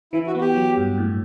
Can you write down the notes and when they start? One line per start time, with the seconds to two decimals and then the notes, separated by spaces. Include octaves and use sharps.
0.13 E3 E4
0.27 F#4
0.35 B3
0.41 G4
0.55 F#3
0.77 G2
0.98 A2